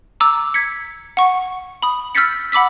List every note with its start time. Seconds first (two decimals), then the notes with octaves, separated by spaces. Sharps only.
0.20 A#5 D6 E6
0.54 G#6 B6 C#7
1.17 F#5 C#6 C#7
1.82 B5 D#6
2.15 E6 F6 G6 A6 B6 C#7
2.52 F#5 B5 D6 E6 B6